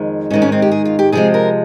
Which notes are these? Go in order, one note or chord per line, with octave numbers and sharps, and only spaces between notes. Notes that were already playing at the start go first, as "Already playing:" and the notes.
Already playing: F2 D#3 G#3
G#2 D#3 G#3 C#4
C#4
C4
G4
G#4
F4
G4
C3 F3 G#3 G#4
A#4